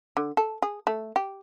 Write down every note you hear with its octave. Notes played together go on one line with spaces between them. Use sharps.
D3
A4
G#4
A3
G4